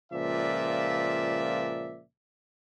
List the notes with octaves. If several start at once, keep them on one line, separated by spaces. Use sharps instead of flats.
C#2 A#2 F3 D5 E5